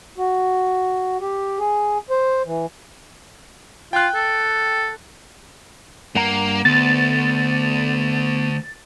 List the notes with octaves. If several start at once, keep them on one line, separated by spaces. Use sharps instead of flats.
F#4
G4
G#4
C5
E3
F4 G5 F#6
A4
G2 A#3 F#5 A#5
D2 B3 A6